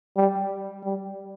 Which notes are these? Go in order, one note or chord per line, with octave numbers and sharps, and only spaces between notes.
G3
G3